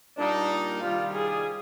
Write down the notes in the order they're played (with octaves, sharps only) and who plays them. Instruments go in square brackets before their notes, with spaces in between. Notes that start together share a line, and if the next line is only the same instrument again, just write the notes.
[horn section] A#2 G3 A#3 D#4 [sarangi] D4
[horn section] C3 D#3 G3 [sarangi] F4
[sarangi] G#4